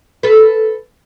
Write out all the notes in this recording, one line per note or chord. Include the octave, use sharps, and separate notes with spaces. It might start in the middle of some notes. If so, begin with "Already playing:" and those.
A4 B4